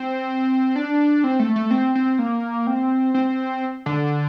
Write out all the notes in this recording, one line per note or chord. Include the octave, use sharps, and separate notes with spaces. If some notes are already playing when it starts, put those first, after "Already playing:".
Already playing: C4
D4
C4
A3
A3
C4
C4
A#3
C4
C4
D3